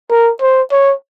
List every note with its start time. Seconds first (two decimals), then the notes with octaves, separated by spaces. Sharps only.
0.10 A#4
0.41 C5
0.72 C#5